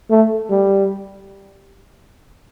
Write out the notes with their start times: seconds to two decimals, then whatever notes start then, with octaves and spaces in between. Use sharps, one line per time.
0.10 A3
0.50 G3